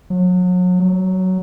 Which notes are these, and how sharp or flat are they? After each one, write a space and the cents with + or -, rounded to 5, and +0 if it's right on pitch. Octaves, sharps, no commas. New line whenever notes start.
F#3 -35
F#3 +10